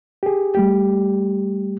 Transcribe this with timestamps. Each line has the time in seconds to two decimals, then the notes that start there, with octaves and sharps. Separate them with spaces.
0.23 G4 G#4
0.55 G3 A3 G4